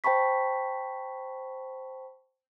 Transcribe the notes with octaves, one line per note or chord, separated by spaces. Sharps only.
C5 G5 A5 B5 C#6 B6